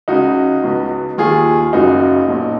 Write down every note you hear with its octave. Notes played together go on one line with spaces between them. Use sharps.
C#2 C#3 D#4 F#4
C#2 B2
D#2 D#3 F4 G#4
F#1 F#2 C#3 D#4 F#4
B1 A#2